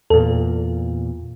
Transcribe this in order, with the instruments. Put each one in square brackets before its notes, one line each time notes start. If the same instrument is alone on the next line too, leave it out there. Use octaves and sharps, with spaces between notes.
[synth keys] E2 A#2 [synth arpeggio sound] A4